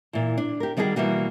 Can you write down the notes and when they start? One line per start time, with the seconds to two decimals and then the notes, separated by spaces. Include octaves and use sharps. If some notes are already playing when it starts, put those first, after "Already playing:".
0.13 A#2 E3
0.38 D4
0.60 G4 A#4
0.77 D#3 G3 D#4 F#4 G#4
0.96 B2 E3 G3 A#3 F#4